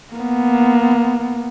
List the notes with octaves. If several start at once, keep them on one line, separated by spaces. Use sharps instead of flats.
A#3 B3